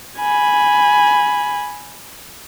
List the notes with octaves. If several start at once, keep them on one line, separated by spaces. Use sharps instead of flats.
G#5 B5